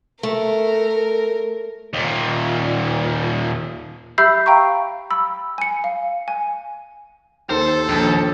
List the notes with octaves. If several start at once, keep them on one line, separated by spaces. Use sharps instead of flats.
A3 A#4
D#2 A#2
G4 E5 B5 E6 G6 C7
F5 G5 A#5 C#6
B5 E6
G#5 C#7
F5
G#5
D#2 A4 C5
A#1 D#2